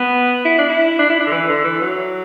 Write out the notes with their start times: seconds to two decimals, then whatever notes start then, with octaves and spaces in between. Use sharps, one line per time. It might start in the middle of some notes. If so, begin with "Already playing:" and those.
Already playing: B3
0.45 E4
0.58 D4
0.69 E4
0.98 D4
1.10 E4
1.20 D4
1.26 D3
1.31 E3
1.48 D3
1.64 E3
1.81 F#3